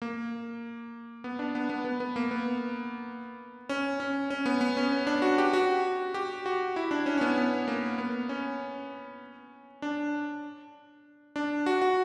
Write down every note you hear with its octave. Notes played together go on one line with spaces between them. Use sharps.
A#3
B3
D4
B3
B3
B3
B3
A#3
B3
C#4
C#4
C#4
B3
B3
C#4
C#4
D4
F#4
G4
F#4
G4
F#4
E4
D4
C#4
C#4
B3
B3
A#3
B3
C#4
D4
D4
F#4
F#4